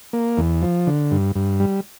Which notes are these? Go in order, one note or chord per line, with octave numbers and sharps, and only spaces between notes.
A#3
E2
F3
D3
G2
G2
G3